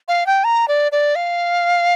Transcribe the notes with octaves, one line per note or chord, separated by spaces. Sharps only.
F5
G5
A#5
D5
D5
F5